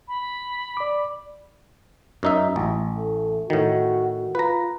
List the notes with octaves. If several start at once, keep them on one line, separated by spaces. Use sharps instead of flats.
B5
D5 D6
F#2 D#4 E5
A1
A3
A2 D#3 F#4
F4 B4 A#5